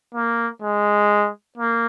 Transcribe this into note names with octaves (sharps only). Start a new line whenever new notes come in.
A#3
G#3
A#3